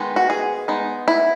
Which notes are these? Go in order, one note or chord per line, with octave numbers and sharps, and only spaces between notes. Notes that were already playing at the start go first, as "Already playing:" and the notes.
Already playing: D#3 G#3 B3 D#4
F#4
G#4
G#3 B3 D#4
E4